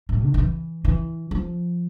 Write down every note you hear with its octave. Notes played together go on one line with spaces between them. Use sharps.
A2
D#3
D#3
E3
E3
F3